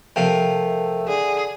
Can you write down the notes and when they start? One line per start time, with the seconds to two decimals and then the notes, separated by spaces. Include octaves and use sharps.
0.16 C3 F3 A3 A#4 G5
1.08 D3 G#4